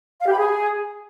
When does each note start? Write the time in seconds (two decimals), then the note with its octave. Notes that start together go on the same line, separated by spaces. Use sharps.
0.22 F5
0.27 G4
0.32 B5
0.37 G#4